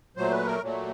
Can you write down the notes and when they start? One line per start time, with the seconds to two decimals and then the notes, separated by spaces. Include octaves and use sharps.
0.16 A#2 F#3 A3 C5
0.31 B4
0.46 A#4
0.62 A#2 F#3 A3